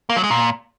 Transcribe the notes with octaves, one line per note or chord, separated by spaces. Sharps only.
A#3
F#3
G#3
A#2